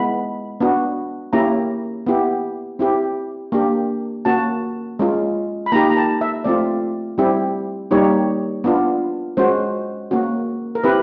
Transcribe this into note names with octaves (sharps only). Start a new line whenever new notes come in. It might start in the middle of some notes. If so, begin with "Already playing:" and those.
Already playing: G#3 B3 E4 B5
B3 D4 F#4
A#3 C#4 E4 G4 A#5
B3 E4 G4
C4 E4 G4
A#3 D4 G4
A#3 C#4 F#4 A5
G#3 C#4 F4
B5
A#3 D#4 G4 A#5
A#5
A5
E5
A3 C4 F4 D5
G3 C4 E4 G4
G3 A#3 D#4 G4 C#5
B3 D4 F4
G#3 C#4 F#4 C5
A#3 C#4 F#4
A#4
C4 E4 G4 B4